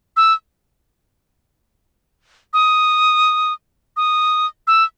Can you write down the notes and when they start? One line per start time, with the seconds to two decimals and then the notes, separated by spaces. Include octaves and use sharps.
0.17 E6
2.53 D#6
3.97 D#6
4.67 E6